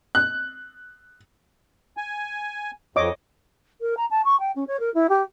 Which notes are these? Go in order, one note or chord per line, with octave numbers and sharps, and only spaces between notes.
F#6
G#5
F2 C#5 D#5 D6
A#4
A#5
A5
C#6
G5
C#4
C#5
A#4
E4
G4